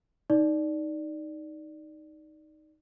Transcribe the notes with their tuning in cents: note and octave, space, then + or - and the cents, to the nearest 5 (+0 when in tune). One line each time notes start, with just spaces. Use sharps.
D#4 +0 D5 +0